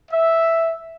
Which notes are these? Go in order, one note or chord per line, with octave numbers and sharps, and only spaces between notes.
E5